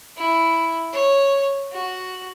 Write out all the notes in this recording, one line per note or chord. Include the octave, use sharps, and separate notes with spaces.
E4
C#5
F#4